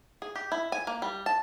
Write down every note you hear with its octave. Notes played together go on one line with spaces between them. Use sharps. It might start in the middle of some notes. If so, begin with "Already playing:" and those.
G#4
G4
E4
G#5
A#3
G3
A5